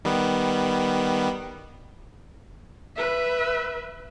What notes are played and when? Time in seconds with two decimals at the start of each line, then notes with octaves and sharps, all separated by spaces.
0.05 D#3 G3 B3
2.96 B4 E5